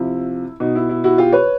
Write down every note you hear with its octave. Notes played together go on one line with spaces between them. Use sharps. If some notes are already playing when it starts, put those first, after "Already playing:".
Already playing: C3 F3 E4
B2 D#4
E4
E4
E4 F#4
F4 G4
B4 C#5